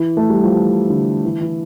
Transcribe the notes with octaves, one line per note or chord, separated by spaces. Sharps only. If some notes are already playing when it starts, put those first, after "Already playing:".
Already playing: E3
A3
G3
F3
E3
D3
E3
E3